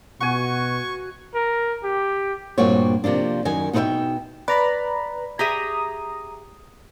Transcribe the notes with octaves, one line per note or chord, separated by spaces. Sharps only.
B2 F#4 G#5 C#6
A#4
G4
G2 A#2 A#3 C4 F#4 C#5
C3 F3 A#3 D4
F#2 D#3 G#5
B2 D#4 G4 B4 E5 G5
B4 D5 A#5 B5
G4 G#4 E5 A#5 D#6